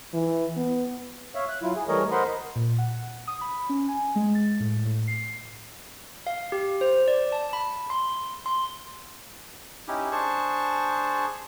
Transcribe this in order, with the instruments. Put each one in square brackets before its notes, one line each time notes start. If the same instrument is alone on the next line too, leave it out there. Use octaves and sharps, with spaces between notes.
[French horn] E3
B3
[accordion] C#5 E5 F5
F#6
F#3 E4 F4
G#4
E3 G3 A3 A#4 C#5 D#5
A#4 C5 D#5 F#5 B5 C6
[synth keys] A#2
F#5
D#6
B5
C#4
G#5
G#3
A6
A2
A2
C7
[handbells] F5
G4
C5
D5
A5
B5
C6
C6
[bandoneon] C#4 D#4 E4 G4
D4 G#4 C5 A5 C#6